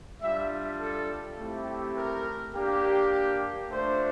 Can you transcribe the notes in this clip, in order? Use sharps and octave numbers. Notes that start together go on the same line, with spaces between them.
G3 D4 F4 E5
A4
A3 C4 E4 G4
A#4
A#3 D4 G4
A3 D4 F4 C5